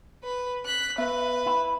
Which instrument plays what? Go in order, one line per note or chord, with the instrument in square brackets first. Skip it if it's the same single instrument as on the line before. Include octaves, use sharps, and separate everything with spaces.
[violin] B4
F#6 B6
[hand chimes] B3 E5 F#6 [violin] B4
[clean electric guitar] E4